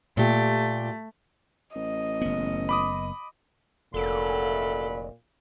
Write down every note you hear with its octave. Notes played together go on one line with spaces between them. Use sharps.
A#2 A3 G4
A1 D#5
F#1 B3
B5 D6 D#6
F1 A#2 C#3 F#3 A4 B5